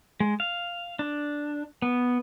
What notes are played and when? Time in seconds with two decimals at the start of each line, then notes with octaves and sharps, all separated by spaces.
0.20 G#3
0.40 F5
0.99 D4
1.82 B3